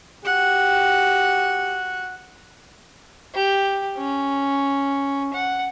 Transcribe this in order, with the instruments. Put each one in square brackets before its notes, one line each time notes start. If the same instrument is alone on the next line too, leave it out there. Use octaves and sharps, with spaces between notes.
[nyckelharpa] F#4 F#5 [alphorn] G4
[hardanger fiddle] G4
C#4
F#5